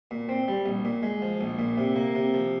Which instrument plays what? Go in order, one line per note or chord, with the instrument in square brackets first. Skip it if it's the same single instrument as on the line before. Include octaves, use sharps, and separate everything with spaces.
[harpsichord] A#2
C4
G3
A#1
A#2
G#3
F3
A#1
A#2
C3
A#3
C3
F3